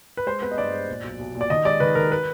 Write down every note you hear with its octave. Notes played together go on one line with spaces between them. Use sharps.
B4
G#3 C5
B3 B4
D#5
G2 D5
G#3
A#2
B1
B1
A#2
D5
D#3 D#5
G#3 D5
D#3 B4
D#3 A#4
B4